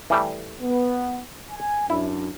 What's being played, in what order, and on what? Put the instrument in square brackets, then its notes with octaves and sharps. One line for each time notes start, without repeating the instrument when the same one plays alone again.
[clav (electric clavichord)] E3 G3 A3
[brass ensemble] B3
G#5
[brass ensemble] F#2 D4 [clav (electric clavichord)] E4